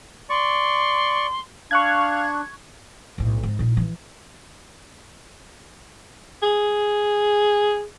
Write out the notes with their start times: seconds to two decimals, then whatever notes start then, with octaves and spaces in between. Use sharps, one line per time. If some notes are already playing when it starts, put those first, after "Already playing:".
0.30 D5 C6 C#6
1.71 D4 F5 C#6 F#6 G#6
3.18 B1 A2
3.43 G#2
3.59 A#2 D#4
3.77 E3
6.43 G#4